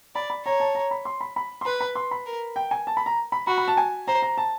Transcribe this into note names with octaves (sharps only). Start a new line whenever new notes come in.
D5 B5
B5
C#5 A#5
A5
A#5
B5
C6
B5
B5
C6
B4 B5
B5
C6
B5
A#4
G5
G#5
A5
B5
A#5
B5
F#4 B5
B5
A5
G#5
C5 A#5
A#5
A5